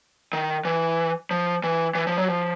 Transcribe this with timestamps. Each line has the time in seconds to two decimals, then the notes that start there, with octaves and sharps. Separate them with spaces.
0.33 D#3
0.65 E3
1.31 F3
1.64 E3
1.95 E3
2.07 F3
2.18 F#3
2.28 F3